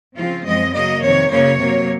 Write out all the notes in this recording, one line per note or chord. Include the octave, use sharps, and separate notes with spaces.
C#3 F3 C4 F4
F#2 F3 G#3 C4 D#5
C#3 F#3 A#3 D#5
F2 C3 D#3 C#5
F#2 C#3 F#3 A#3 C#5
C3 F#3 A#3